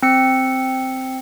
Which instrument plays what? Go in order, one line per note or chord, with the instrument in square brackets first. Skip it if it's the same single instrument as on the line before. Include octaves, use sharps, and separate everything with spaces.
[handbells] C4 E6 C#7